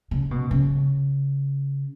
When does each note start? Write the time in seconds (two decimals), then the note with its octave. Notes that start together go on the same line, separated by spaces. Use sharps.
0.11 C#3
0.31 B2
0.51 C#3